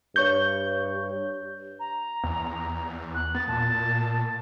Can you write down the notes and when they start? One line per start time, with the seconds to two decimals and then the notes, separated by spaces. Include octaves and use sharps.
0.16 G2 C#5 C#6 G6
1.80 A#5
2.24 E2
3.15 F#6
3.35 B3 A6
3.48 A#2 A5